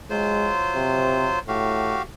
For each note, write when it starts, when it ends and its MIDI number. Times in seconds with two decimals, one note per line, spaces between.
0.10 1.39 54
0.10 0.51 56
0.10 1.39 65
0.10 1.39 72
0.75 1.31 48
1.48 1.99 45
1.48 2.02 66
1.48 2.02 67
1.48 2.02 77